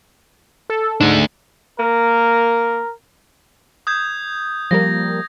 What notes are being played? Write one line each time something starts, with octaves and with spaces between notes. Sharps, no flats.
A4
G#2 A3 D4
A#3 A#4
D#6 G6 G#6
F3 G3 A#3 A#6